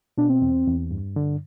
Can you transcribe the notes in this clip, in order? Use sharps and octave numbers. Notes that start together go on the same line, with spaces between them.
B2 D4
C4
E2
E2
G2
D3